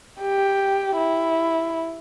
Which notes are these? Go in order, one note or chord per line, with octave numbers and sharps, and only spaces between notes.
G4
E4